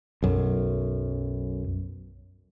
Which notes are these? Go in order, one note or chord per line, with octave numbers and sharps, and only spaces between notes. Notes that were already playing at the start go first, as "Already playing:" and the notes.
B1 F#2